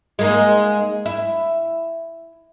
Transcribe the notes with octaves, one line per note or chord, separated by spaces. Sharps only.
G#3 A#3 D#4
E4